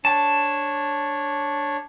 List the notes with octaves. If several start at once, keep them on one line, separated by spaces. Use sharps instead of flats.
D4 C#5 A5